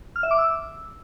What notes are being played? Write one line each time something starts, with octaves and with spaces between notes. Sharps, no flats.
F6
E5
D6
E6